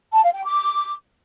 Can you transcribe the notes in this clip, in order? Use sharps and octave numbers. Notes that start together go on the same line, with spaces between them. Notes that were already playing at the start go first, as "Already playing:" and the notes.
A5
F5
G5
D6